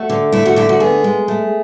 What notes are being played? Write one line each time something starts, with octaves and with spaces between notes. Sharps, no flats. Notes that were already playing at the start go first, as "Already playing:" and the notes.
Already playing: A3 F#4
D3
A3 E4
F#4
D3 E4
F#4
B3 G#4
G#3
A3